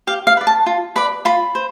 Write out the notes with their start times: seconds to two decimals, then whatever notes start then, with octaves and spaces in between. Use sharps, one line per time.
0.07 G4 F5
0.27 F5
0.37 B4 D5
0.47 A5
0.66 F4
0.96 B4 D5 B5
1.25 F4 B5
1.55 C5